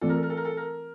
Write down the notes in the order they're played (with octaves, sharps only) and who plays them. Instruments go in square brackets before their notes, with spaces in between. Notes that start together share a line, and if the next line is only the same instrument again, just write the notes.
[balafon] E3 A3 C4 F4 [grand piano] A4
[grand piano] A#4
A4
A#4
A4
A#4
A4
A#4